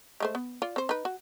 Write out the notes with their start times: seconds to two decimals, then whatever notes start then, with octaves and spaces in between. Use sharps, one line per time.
0.20 G#3 A3 C5
0.35 B3
0.62 F4 D5
0.76 C4 C5
0.89 D#4 B4
1.05 F#4